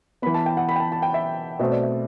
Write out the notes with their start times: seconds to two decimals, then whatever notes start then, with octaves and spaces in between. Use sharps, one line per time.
0.22 E3 B3 B5
0.34 A5
0.46 G5
0.57 F#5
0.69 B5
0.76 G5
0.80 A5
0.92 A5
1.02 G5
1.14 E5
1.59 B2 A3 C4 E5
1.71 D5
1.83 E5